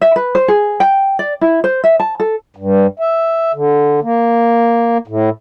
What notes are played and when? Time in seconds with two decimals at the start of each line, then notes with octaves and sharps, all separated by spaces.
0.01 E5
0.16 B4
0.35 C5
0.48 G#4
0.80 G5
1.19 D5
1.41 E4
1.64 C5
1.84 E5
2.00 A5
2.20 A4
2.56 G2
2.99 E5
3.54 D3
4.03 A#3
5.07 A2